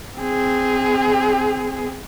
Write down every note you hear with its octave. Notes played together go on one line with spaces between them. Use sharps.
C4 G#4